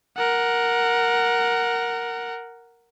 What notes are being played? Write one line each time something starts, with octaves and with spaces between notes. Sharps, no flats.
A#4 F#5